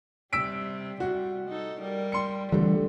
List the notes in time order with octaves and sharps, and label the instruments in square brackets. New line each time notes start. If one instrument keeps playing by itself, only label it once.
[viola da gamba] C3 G3 [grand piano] E6 B6 D7
[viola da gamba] C3 G3 [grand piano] F#4
[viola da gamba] D#4 A4
G3 A#4
[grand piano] C6 C#7
[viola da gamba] F2 [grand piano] D3 A3 [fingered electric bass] E3 G3